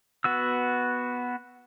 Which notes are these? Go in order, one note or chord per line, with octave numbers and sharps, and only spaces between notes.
B3 F#4 E6